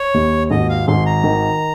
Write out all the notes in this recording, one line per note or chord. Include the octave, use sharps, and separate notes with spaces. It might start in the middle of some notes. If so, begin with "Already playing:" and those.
Already playing: C#5
D#2
G#1 D#5
F5
G#1 C6
A#5
D#3